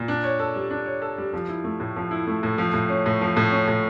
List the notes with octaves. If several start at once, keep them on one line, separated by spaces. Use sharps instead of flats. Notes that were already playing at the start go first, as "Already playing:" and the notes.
Already playing: A#2
D4
C#5
A4
G3
D4
C#5
A4
G3
F3
E4
A3
A2
F3
E4
A3
A2
F3
A2
C#4
A2
F3
A2
C#4
A2